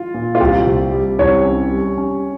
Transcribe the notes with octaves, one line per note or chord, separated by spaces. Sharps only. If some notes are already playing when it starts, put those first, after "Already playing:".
Already playing: F4
A#2
F4
C2 G4
C3
G3
C2 C#5
C#4
G3
C#4